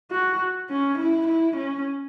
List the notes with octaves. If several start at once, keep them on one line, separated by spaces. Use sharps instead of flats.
F#4
C#4
E4
E4
C#4